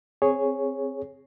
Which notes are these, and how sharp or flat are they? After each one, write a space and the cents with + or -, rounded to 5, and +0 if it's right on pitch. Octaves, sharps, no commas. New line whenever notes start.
C4 +0 G#4 +0 C#5 +0